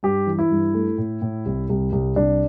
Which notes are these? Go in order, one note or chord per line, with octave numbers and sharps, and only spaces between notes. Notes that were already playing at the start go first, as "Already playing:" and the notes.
G2 G4
E3
E4
G2
A3
A2
A2
C2
C2
C2
C2 D4